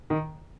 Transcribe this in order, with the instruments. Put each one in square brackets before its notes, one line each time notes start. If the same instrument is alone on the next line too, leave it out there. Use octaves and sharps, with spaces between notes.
[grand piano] D#3